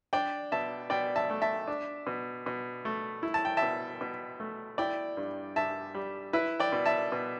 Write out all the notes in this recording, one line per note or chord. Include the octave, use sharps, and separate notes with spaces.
D4 D5 G5
B2 E5 A5
B2 D5 G5
E5 A5
A3
E5 A5
D4
B2
B2
A3
E4
A5
G5
E5 A5
B2
B2
A3
E4 D5 G5
G2
G2 E5 A5
G3
E4 B4 E5
D5 G5
B2
E5 A5
B2